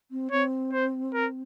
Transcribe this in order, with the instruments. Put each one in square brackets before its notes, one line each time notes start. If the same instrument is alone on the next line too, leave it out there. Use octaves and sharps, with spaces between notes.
[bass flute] C4
[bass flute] C4 [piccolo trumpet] C#5
[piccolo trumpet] C5
A#4